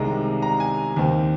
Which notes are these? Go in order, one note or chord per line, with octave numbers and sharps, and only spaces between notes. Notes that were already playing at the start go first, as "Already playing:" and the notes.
Already playing: C2 C3 D#3 G#3 A#5
A#5
G#5
D#2 D#3 C4